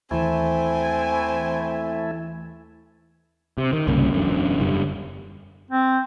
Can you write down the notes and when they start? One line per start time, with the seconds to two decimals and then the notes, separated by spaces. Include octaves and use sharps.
0.11 D#2 E3 A3 C4 E4 G#5
3.58 C3
3.73 D#3
3.87 C2 G2 C#3 A#3
4.13 E1 F#2 D3
4.60 F#1 F#2 D3 G3
5.70 C4